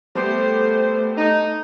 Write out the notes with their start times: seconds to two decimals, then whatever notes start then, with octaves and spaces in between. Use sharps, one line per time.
0.15 G3 A3 B3 G4 C5
1.18 D#4